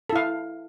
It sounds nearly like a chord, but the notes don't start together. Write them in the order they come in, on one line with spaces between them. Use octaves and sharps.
A4 E4 F5